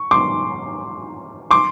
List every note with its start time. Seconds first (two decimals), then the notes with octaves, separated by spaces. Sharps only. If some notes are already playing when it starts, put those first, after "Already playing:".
Already playing: C#6
0.11 C6 D6
1.51 C6 D6